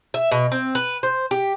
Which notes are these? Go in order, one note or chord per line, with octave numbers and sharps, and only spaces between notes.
E5
B2
C4
B4
C5
G4